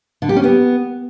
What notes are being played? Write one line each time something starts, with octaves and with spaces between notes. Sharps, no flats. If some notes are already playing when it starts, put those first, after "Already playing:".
D3
G4
C#4
B3